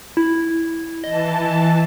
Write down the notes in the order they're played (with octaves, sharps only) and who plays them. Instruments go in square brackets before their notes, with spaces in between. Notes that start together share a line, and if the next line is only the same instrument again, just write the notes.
[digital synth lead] E4
[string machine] E3 A5 [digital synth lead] D#5